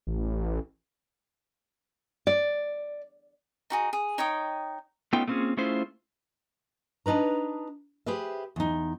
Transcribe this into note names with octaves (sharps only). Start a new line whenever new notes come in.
A1
D5
D#4 F#4 G#4
G#4
D#4 C#5 G5 D#6
A3 B3 C#4 D#4 F4 G5
A3 A#3 C4 C#4 F4 G#4
A3 C#4 E4 F4 G#4 C5
D4 D#4 B4 A#5
G4 G#4 B4 C5 E5
E2 D#4